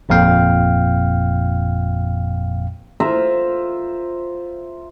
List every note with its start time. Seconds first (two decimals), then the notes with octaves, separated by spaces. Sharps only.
0.09 G1 F2 A#2 F5 G5
3.00 F4 C5 E5 A#5